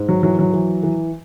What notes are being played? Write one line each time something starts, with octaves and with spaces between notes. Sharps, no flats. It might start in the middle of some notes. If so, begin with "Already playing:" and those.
Already playing: G#2
F#3
E3 F#3
F#3
E3
E3